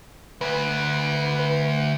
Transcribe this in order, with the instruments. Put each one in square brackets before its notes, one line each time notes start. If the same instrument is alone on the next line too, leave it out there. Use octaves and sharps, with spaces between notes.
[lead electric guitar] D2 [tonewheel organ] B4